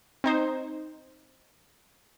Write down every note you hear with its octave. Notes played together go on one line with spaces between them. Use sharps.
C4 D#4 C5